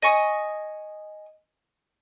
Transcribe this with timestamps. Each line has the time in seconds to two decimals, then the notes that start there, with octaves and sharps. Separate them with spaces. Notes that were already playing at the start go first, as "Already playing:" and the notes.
0.02 D#5 G#5 C#6 D#6